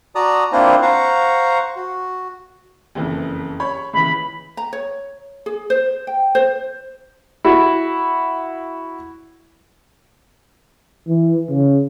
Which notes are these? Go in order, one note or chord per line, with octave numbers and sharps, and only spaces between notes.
F#4 D5 A5 A#5 D#6
A#3 C4 D4 E4 F4 C5
C5 F5 F#5 A#5 C#6
F#4
F#1 F2 E3
C#5 B5
C#2 E3 B5
A#5
C#5
G#4
C5
G5
C5
E4 F#4
E3
C#3